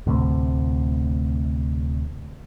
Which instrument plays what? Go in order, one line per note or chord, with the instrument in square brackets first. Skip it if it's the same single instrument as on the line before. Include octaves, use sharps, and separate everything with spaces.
[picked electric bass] D2 A2 C3